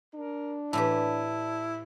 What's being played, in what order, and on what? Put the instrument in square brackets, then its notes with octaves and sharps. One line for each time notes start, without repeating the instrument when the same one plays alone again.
[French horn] D4 [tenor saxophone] A#4
[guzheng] A2 E3 G4 [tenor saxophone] E4 [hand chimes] D5 A5